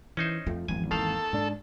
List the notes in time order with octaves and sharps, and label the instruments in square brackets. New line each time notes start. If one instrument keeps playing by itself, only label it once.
[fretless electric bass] E3 [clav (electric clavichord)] C#4 D#4 C5
[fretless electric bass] F2 F3 A3 [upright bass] C4
[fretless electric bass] G#1 E2 [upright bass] F3 [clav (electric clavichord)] G#5
[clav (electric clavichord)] D#3 F5 [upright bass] A#3 [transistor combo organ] A4
[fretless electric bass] G#2 D4